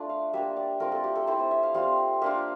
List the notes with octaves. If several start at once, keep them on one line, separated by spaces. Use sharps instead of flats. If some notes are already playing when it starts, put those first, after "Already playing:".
Already playing: A3 D4 F4
F5
G3 A#3 D4 E5
D5
A3 C4 F4 A#4
A4
G4
A4
A3 C4 E4 C5
C5
E5
F5
G3 C4 F4 F5
A#3 D4 F4 E5